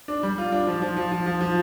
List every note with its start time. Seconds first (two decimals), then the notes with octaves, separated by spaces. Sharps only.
0.08 D4
0.23 G3
0.38 F4
0.52 D4
0.67 F3
0.82 F3
0.97 F3
1.12 F3
1.26 F3
1.41 F3